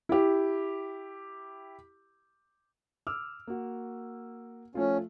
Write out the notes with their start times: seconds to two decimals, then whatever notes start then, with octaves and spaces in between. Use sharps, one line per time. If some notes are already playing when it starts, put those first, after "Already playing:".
0.09 E4 G4
3.07 D6 E6 F6
3.47 A#3 F#4
4.75 F3 A3 C#4 F4